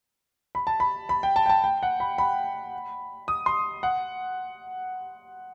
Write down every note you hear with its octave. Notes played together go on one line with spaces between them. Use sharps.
B5
A5
B5
B5
G5
A5
G5
A5
G5
F#5
B5
B5
D#6
C6
F#5